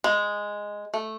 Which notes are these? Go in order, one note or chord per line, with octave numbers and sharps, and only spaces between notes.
G#3
A3